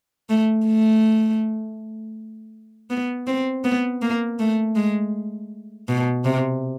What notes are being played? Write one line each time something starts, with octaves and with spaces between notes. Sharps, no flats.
A3
A3
B3
C4
B3
A#3
A3
G#3
B2
C3